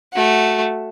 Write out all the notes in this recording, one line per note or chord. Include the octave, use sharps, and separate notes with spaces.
A3 F#4